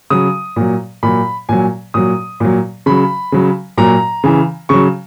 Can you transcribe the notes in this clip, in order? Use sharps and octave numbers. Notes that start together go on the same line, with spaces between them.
C#3 F#3 D#6
A#2 F#3
A#2 F#3 B5
A#2 F#3 G#5
A#2 F#3 D#6
A#2 F#3
C#3 F#3 B5
C#3 F#3
A#2 F#3 A#5
C#3 E3
C#3 F#3 C#6